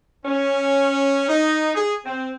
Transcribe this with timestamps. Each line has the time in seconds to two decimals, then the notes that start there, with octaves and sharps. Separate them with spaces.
0.24 C#4
1.28 D#4
1.74 G#4
2.05 C4